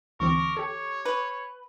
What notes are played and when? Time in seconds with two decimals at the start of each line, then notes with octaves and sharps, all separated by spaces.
0.20 D2 E3 C4 A#4 C#6 D6
0.57 G4 A4 C#5
1.05 B4